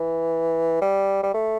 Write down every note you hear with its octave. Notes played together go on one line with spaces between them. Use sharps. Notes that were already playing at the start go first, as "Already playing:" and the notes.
Already playing: E3
G3
G3
A3